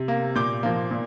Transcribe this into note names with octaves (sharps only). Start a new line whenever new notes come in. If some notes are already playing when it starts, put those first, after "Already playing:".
Already playing: C3
A#3
A#2 D6 G6
F3 A#3
A#2